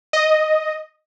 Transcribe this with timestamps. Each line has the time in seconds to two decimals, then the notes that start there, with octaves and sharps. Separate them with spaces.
0.13 D#5